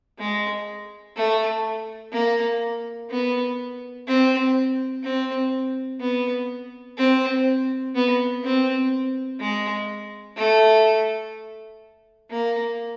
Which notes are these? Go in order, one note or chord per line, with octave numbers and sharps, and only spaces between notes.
G#3
A3
A#3
B3
C4
C4
B3
C4
B3
C4
G#3
A3
A#3